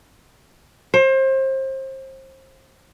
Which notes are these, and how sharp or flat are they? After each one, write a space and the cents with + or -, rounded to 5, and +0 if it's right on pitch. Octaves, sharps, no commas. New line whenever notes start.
C5 +30